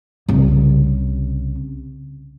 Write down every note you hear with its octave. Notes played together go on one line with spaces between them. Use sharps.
C2 C#3